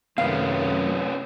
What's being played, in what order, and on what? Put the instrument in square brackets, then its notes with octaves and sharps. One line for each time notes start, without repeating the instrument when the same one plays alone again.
[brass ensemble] F#2 [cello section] C3 D#3 A3 [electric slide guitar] C4 C#4 B4 [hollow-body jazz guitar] F5